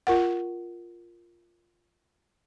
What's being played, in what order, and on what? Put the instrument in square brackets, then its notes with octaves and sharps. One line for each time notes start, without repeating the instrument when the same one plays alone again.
[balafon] F4 A#4 F#5